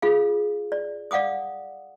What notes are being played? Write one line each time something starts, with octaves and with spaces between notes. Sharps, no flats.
F4 G#4 F5
D5
D5 F5 F#5 D6 D#6